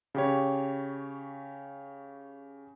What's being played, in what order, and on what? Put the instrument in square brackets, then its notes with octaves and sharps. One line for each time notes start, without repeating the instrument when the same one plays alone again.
[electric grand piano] C#3 G4 C#5